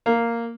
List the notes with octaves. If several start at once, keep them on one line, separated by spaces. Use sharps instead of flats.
A#3